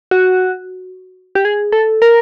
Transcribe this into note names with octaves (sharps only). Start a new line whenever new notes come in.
F#4
G4
G#4
A4
A#4